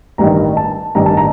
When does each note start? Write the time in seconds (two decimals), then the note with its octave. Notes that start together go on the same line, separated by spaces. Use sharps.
0.18 A1 G2 D#3 A#5
0.57 A5
0.95 A1 G2 D#3 A#5
1.06 A5
1.17 A#5